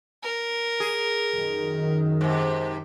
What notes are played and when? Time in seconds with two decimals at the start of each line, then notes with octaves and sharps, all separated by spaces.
0.23 A#4
0.80 G#4
1.33 F#2 D#3
2.21 G#2 C3